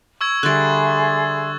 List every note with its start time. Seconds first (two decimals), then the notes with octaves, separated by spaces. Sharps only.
0.21 C#6 E6 G#6
0.43 D3 G3 G#4 E5 C6 F#6 A6